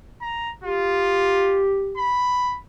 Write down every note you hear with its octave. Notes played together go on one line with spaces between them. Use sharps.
A#5
F4 G4
B5